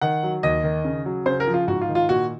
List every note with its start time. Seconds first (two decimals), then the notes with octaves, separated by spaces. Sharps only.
0.01 D#3 F#5
0.23 F#3
0.43 D#2 D#5
0.64 D#3
0.85 C#3
1.06 F#3
1.26 C#3 C5
1.40 A#4
1.48 F3
1.54 F4
1.68 G#2 F#4
1.81 F4
1.88 D#3
1.95 F4
2.09 A#2 F#4